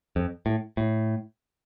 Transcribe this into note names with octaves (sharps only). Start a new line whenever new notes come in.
F2
A2
A2